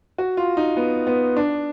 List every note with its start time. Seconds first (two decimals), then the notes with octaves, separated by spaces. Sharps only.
0.18 F#4
0.37 F4
0.57 D#4
0.77 B3
1.07 B3
1.37 D4